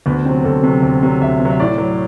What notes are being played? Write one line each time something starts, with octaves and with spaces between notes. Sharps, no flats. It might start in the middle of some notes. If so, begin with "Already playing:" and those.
D2 B3
C3 F#3 C4
D2 A4
C3 F#3
D2
C3 F#3
D2 E5
C3
F#3
E5
A2 D5
F#3